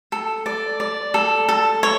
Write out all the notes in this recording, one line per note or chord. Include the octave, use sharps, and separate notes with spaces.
A4
D5
D5
A4
A4
C#5